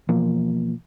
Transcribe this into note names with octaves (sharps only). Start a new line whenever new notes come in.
B2 E3 F3 A#3